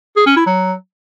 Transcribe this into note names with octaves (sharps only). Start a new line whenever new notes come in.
G#4
C#4
E4
F#3